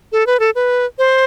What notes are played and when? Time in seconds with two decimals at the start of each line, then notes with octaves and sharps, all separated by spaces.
0.12 A4
0.27 B4
0.40 A4
0.55 B4
0.99 C5